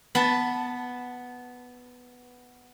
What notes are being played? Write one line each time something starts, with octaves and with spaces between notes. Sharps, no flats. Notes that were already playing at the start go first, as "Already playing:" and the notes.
B3 B4 A5